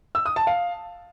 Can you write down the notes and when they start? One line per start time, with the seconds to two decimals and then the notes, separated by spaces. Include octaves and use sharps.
0.15 E6
0.26 D#6
0.36 A5
0.47 F5